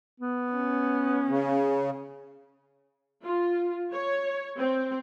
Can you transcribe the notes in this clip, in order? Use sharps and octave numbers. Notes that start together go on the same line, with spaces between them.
B3
C#4
C#3
F4
C#5
C4